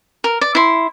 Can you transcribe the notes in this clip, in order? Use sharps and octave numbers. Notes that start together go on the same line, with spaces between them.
A#4
D5
E4 C6